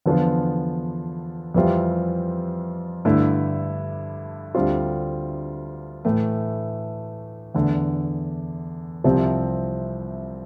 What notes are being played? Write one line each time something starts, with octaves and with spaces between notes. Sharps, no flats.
E2 D3 F3 B3 F4
F2 E3 G3 C4 F4
G2 D3 A3 E4
D2 D3 G3 C4 F4
A2 E3 A3
E2 D3 A3
C2 C3 F3 C4